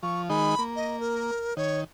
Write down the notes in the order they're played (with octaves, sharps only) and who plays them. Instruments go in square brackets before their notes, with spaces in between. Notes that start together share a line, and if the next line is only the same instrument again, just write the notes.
[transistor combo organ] F3 [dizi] C#6
[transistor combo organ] D#3 G#3 D#4 [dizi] B5
[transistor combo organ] A#3
[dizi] D#5
A#4
[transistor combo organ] D#3 [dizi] C#5